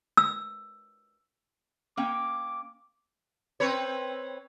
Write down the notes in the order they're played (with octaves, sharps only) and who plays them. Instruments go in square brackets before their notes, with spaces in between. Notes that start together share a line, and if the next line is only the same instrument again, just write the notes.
[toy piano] E6
[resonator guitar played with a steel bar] A#3 C#4 G5 [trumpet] D6
[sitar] C4 B4 C#5